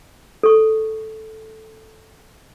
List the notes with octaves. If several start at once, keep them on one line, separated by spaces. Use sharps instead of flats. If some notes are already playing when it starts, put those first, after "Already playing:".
A4 C#6